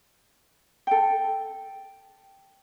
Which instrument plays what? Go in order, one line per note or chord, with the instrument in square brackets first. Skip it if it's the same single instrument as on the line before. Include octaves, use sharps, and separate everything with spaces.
[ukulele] A4 G5